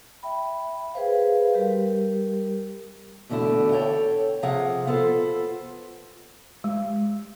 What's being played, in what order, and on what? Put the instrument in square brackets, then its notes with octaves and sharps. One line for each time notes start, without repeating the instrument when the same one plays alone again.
[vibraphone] E5 G5 B5
G#4 B4 C5 F5
G3 G4 A#4
[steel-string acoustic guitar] E2 B2 D3 A3 E4
A4 C#5 G5
C3 F3 F4 G#4 F5 F#5
B3 F4 A4 B4 C5
[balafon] G#3